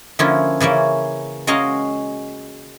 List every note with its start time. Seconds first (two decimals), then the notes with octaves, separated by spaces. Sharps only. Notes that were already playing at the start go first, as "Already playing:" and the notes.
0.19 D3 F3 A#3 C#4 E4 F4
0.60 C#3 E3 A#3 C#4
1.47 G#3 C#4 F#4 D#5 F5 A#5